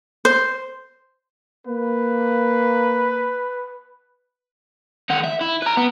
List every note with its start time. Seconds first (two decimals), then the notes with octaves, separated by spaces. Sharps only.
0.25 C5
1.67 A#3 B4
5.10 D#3 F#5
5.24 E5
5.41 E4
5.62 B4 A#5
5.77 B3